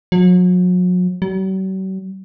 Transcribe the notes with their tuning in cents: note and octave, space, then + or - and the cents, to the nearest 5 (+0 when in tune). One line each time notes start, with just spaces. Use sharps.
F#3 -40
F#3 +45